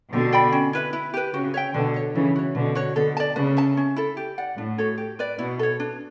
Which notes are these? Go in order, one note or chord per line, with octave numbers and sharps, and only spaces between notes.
B2 D3 G4
D5 G5 B5
C#4
E4 B4 E5
E4
G4 B4
C#3 F#4
C#5 E5 G5
B2 D3 F#4
A4 C#5
C#3 E3 C#4
F#4 C#5
B2 D3 D4
F#4 C#5
B2 D3 A4
D5 A5
C#3 B4
E5 A5
C#4
E4 A4
G4
D5 F#5
A2 D4
F#4 A4 C#5
G4
B4 D5
B2 E4
A4 C#5
D4